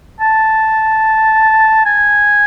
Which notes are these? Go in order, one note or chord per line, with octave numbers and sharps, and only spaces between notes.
A5
G#5